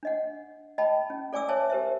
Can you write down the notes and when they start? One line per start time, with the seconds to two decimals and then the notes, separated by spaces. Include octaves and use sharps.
0.03 D4 D#5 F#5
0.78 D#5 G5 A5 B5
1.10 C#4
1.33 A4 D5 G#5 D6 E6
1.49 B4 C#5 E5 G#5 A5
1.70 G4 A#4 C5 E5